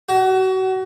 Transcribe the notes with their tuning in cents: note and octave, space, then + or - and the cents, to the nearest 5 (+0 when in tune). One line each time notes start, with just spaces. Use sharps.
F#4 +30